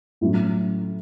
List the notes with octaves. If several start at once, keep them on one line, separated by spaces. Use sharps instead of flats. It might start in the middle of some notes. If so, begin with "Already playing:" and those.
A2 F#3 C#4 E4